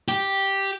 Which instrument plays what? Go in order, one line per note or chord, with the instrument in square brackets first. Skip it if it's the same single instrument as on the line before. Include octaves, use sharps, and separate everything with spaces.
[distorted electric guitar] G4